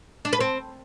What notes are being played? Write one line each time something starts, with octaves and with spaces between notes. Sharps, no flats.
D4
B4
C4